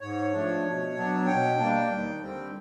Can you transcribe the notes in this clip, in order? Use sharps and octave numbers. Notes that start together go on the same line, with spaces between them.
G#2 C#5
F3 A3 D4
B2
F#3 B3 D4
B2 G5
G3 A#3 D4
D#2
D3 G3 C4